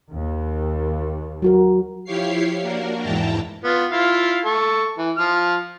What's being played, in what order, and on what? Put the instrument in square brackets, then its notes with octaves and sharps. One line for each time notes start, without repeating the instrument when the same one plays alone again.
[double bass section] D#2
[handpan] F#3 F#4 A#4
[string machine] F3 E4 G4 C#5 F5 C7
A#3 D4 F#4 A#4
E2 G#2 E4 G5 A5 A#5
[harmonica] B3 F4
E4 F4 F5
A4 C#6
E3
F3 F6